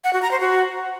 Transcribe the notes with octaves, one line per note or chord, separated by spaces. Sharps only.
F#5
F#4
A#5
C5
F#4